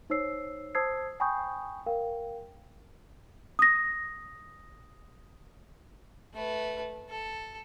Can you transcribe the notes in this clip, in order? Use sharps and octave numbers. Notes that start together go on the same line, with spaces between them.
D#4 C5 C#5 E6 C7
C5 A5 D#6 E6 G#6 C7
G5 G#5 B5 C#6 D#6 G6
A#4 F5 G5
D#6 A#6
A3 B4
A4